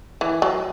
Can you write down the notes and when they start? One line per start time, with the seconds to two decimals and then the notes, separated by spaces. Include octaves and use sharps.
0.21 E3
0.42 F#3